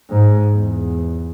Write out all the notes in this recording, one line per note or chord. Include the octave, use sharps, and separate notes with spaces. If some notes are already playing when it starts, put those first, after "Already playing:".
G#2
E2